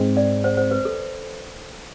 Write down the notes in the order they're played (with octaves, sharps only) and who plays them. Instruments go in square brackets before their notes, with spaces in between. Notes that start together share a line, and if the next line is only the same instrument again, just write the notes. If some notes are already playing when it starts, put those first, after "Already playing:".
Already playing: [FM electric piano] G#2 G#3 C4
[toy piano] D5
C5
C5
B4
A4